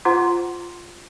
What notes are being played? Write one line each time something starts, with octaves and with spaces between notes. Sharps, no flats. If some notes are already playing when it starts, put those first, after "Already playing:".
F4 C5 F#5 A#5 C6